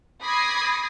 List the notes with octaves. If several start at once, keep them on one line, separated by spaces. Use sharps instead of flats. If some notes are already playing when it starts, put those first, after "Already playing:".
B5 D6 D#6 G#6 A#6 C7